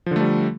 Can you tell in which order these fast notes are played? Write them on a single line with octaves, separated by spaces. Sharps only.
F3 D3 A3 G3